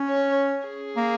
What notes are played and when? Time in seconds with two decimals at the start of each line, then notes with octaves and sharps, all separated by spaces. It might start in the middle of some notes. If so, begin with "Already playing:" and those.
Already playing: C#4
0.09 C#5
0.67 G#4
0.96 A#3